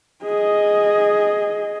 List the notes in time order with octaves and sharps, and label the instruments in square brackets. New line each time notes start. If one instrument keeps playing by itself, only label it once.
[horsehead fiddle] G#4 D#5